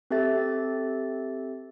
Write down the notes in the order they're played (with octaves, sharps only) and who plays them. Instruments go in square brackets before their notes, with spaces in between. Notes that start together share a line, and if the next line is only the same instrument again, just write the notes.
[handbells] C4 G4 A4 E5 A6